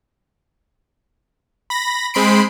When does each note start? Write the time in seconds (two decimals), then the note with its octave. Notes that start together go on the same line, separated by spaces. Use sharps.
1.70 B5 A#6
2.14 G#3 C4 B5 C6 C7 D7